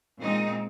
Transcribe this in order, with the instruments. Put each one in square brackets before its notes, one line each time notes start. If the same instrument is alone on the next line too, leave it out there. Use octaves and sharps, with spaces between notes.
[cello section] A#2 G#3 C4 D#4